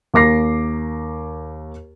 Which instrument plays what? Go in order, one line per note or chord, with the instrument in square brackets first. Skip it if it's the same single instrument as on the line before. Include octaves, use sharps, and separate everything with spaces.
[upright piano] D#2 A#4 D6 A#6 C7